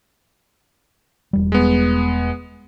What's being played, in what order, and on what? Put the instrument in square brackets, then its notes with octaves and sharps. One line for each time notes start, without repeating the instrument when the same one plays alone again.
[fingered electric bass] E1 G3
[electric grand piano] G#3 B3